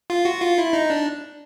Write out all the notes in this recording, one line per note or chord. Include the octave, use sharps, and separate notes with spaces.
F4
F#4
F4
E4
D#4
D4